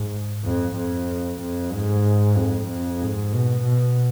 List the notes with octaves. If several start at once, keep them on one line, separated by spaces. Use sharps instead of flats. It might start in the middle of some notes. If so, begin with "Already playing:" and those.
Already playing: G#2
F2
F2
F2
G#2
F2
F2
G#2
B2
B2